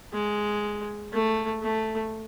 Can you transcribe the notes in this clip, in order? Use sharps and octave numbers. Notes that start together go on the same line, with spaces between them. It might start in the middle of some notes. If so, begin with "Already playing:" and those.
G#3
A3
A3